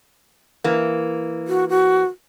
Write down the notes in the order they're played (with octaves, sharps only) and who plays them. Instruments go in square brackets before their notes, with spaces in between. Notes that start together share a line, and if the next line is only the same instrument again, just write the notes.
[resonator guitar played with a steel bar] E3 A#3
[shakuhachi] F#4
F#4